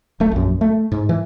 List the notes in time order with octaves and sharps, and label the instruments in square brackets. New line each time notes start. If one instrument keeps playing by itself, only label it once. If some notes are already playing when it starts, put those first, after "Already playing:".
[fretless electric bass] D1 A3
A#1 F#2
A3
G#2
E3